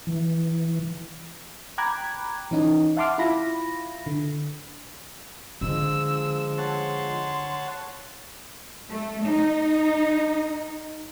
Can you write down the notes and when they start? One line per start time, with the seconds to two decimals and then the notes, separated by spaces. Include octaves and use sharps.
0.07 E3
1.78 G5 A#5 B5 D6 F#6 G#6
2.51 E3 C#4 D#4
2.97 E5 F#5 A5 C6 D6 F6
3.18 E4 F4 B5 A#6
4.06 D3
5.61 D3 F3 G#3 E6
6.58 C#5 F#5 A5 C6
8.89 A3
9.24 D#4